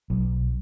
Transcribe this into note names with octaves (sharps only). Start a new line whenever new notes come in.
B1